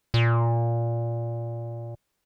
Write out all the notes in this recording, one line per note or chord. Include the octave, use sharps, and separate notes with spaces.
A#2